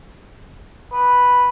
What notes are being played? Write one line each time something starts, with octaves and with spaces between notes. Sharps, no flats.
B4